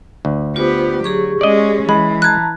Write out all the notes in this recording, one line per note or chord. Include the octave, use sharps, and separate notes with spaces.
D2
B3 F4 G4 C5
F#3 G4 G#4 C#6
G#3 C#4 D5 D#5
E3 G#3 B5
A5 A#5 F#6 G#6